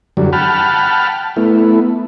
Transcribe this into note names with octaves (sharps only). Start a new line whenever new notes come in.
F#2 D3 F#3 G3
F#5 G5 A5 B5 F6
A3 B3 E4